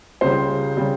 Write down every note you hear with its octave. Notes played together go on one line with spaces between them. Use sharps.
C#2 C#3 G3 C5
C#3 G3